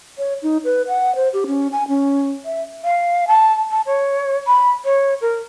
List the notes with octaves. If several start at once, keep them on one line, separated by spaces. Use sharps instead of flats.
C#5
D#4
B4
F#5
C5
G4
C#4
G#5
C#4
E5
F5
A5
A5
C#5
B5
C#5
A#4